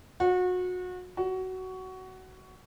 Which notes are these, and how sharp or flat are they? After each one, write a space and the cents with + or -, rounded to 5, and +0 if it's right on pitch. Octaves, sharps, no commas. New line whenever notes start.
F#4 -30
F#4 +15